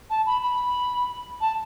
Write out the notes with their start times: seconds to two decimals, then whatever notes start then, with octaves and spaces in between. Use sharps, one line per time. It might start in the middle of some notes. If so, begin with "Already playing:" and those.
0.10 A5
0.26 B5
0.42 B5
1.41 A5